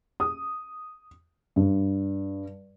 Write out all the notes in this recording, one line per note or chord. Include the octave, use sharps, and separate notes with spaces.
D#6
G2